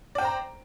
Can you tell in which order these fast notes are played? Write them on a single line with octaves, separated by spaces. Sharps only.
D5 G5 C5 A#5